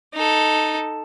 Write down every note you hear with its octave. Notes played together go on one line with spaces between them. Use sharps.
D#4 A4